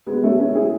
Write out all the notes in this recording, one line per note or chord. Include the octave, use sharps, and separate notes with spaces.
G#3 B3
A3 C#4
C#4 E4
E4 G#4